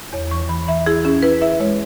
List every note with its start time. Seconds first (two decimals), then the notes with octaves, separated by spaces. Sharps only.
0.13 E2 C#5
0.31 E3 C#6
0.49 E3 B5
0.68 E3 E5
0.86 E4 G#4
1.05 C#4 G#4
1.23 E4 B4
1.42 E4 E5
1.60 G#3 C#5